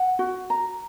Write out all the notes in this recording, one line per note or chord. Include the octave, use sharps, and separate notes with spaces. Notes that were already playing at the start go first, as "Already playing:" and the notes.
Already playing: F#5
F#4
A#5